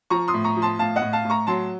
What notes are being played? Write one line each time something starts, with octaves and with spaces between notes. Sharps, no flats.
F3 A#5 C#6
C6 D#6
A2
A#5 C#6
F3
A5 C6
A2 F5 A5
D#5 F#5
A2
F5 A5
A2
A#5 C#6
F#3 A5 C6